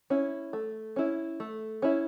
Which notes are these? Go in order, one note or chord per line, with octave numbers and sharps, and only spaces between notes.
C#4 E4
A3
C#4 E4
A3
C#4 E4